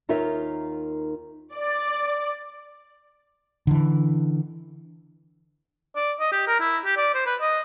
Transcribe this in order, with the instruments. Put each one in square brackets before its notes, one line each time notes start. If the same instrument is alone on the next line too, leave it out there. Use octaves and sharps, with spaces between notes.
[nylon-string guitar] D#2 D#4 F4 A#4 C#5 E5
[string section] D5
[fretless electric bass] D3 E3
[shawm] D5
D#5
G4
A#4
E4
G4
D5
C5
B4
D#5